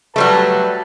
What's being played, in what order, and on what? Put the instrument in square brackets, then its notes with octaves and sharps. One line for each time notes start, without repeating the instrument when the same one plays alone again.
[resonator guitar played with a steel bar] F#3 G3 A3 [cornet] B4 [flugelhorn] A5